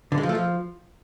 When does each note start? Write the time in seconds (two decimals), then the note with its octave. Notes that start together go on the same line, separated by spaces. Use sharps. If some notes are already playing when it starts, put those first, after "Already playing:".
0.12 D3
0.18 G#3
0.23 F3
0.29 A3
0.35 F3